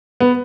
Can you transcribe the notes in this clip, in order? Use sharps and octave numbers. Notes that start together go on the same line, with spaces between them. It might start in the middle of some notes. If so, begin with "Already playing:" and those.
B3